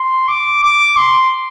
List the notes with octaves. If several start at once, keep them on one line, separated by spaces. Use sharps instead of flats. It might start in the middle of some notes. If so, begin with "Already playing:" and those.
Already playing: C6
D6
D6
C6